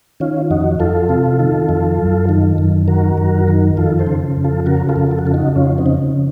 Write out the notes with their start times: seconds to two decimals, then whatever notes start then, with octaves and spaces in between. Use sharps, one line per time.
0.20 D#3 C#4 F4
0.50 F2 D#4 F#4
0.79 F2 F4 A4
1.09 C3
1.39 D#3
1.69 F2
1.99 F#2
2.29 D#3
2.58 F#2
2.88 D#3 F#4 A#4
3.18 F#2
3.48 D#3
3.77 F2 F4 A4
3.99 A4 C5
4.07 C#3
4.37 F2
4.44 F4 A4
4.66 C#3 F#4 A#4
4.89 F4 A4
4.96 F2
5.11 A4
5.19 F#4
5.26 C#3 F4 A4
5.34 D#4 F#4
5.56 F2 C#4 F4
5.78 C4 D#4
5.86 C#3